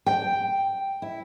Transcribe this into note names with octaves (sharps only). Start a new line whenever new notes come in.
G5
E4